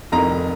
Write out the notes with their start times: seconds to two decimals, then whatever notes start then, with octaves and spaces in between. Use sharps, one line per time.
0.12 F1 F2 C3 D#3 A#5